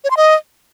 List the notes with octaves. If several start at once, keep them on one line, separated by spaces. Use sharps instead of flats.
C#5
C6
D#5